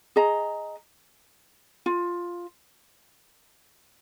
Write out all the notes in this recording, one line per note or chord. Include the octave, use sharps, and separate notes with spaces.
G#4 D#5 A#5
F4